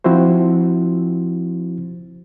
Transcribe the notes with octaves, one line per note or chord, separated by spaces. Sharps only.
F3 C4 E4 F#4 C5